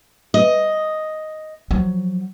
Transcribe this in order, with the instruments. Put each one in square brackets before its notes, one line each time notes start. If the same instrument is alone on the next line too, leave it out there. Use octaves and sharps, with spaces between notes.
[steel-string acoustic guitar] D#5
[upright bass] F3 F#3